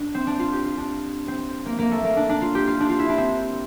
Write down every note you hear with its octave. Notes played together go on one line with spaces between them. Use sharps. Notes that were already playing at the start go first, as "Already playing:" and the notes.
Already playing: D4
C4
D4
F4
G4
F4
D4
C4
A#3
A#3
A3
A#3
D4
D4
F4
G4
F4
D4
F4
E4
D4
C4